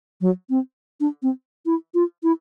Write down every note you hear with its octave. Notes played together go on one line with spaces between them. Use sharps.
F#3
C4
D4
C4
E4
F4
E4